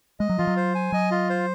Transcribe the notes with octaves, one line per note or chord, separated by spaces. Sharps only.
G#3 D#5
F#3
F3 F4
F#3
C5
G#5
F#3 D#5
F4
C5